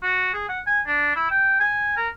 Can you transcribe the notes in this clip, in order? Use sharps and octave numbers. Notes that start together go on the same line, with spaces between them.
F#4
G#4
F#5
G#5
D4
E4
G5
G#5
A#4